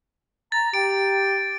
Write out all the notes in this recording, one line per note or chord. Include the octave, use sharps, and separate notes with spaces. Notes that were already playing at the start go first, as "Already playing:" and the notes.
A#5 A6
G4 G5 D7